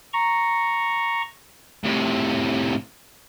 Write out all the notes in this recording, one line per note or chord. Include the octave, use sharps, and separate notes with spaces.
A#5 C#6
A2 C3